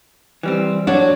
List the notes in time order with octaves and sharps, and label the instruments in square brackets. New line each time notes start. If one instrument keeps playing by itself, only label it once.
[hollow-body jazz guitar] E3 G3 C4
[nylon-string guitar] F#3 F#4 [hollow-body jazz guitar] D4